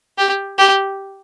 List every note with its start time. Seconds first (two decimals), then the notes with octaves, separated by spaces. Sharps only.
0.18 G4
0.59 G4